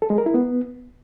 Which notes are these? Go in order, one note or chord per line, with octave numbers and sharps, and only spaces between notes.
A4
G#3
A#4
E4
B3